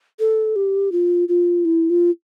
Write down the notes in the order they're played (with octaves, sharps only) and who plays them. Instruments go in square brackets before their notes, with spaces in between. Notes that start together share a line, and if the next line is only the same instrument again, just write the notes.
[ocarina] A4
G4
F4
F4
E4
F4